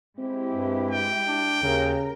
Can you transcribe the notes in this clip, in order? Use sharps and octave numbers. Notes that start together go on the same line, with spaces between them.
G#3 C4 E4 G4
G2
G5
D4
D#2 C#3 A#4